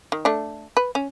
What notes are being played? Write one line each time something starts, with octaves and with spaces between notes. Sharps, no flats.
D#3
A3 D4
B4
C#4